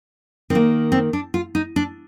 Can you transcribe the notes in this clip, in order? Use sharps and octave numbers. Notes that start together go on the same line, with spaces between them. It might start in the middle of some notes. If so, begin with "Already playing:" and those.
D#3 A#3 C4
C4
D4
F4
D#4
D4